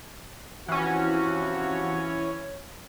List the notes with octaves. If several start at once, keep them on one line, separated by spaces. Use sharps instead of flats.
C3 E3 F3 C#4 F#4